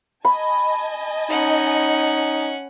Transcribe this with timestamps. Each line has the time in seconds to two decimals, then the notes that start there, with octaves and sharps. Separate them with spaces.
0.25 D#5 G#5 A5 B5
1.30 C#4 D#4 F#5